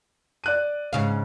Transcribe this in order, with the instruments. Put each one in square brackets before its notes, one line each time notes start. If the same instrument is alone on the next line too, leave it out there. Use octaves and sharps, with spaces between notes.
[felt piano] D5 F#6 D#7
[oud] G#2 C#3 F5